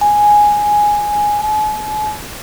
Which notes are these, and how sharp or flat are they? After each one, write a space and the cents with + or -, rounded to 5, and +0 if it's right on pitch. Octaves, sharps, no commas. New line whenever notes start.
G#5 +0
G#5 +45